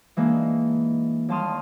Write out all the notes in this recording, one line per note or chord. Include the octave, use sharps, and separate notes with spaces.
E3 G#3 A#3 D4 D#4
D#2 G3 A5 C6 D#6 F6